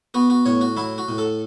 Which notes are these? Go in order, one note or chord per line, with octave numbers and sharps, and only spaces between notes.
B3 F#4
F#4
A2 C#5
F#4
F#3 E4
F#4
A2
A4